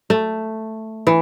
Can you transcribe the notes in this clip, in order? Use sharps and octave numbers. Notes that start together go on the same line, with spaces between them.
A3
E3